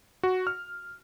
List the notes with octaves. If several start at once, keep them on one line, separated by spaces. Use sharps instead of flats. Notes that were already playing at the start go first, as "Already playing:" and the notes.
F#4
F6